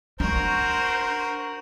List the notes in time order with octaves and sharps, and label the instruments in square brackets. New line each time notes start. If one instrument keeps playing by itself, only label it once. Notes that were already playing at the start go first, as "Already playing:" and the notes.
[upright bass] D4 [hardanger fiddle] F#4 A#4 [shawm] C5